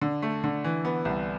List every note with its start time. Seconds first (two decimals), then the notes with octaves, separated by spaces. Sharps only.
0.02 D3
0.22 A3
0.44 D3
0.64 E3
0.85 B3
1.05 C2